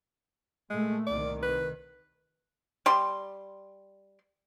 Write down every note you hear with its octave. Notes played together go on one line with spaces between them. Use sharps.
A#2 G#3 A3
C2 D#3 D5
B4
G3 C6